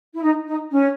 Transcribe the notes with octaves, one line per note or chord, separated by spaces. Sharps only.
E4
D#4
D#4
C#4